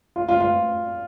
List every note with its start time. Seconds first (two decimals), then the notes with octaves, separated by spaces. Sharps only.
0.16 F4
0.29 F4
0.40 F4